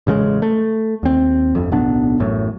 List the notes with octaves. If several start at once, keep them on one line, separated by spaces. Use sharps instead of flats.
A1 C#3 F#3 G#3
A3
D#2 C4
G1 F2
D1 B1 B3 D4
A1 F#2 A2